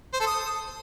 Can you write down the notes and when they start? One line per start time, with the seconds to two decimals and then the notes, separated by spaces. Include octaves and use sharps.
0.14 C5
0.20 A4
0.27 D#6